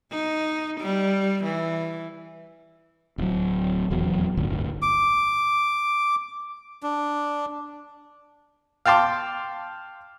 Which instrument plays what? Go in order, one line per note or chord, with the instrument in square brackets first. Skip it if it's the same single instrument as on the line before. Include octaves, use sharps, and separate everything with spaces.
[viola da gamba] D#4
G3
E3
[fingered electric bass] D1 F#3
D#1 E2 F#3
D1 G1 D2
[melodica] D6
D4
[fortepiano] F5 G5 A5 C6 D6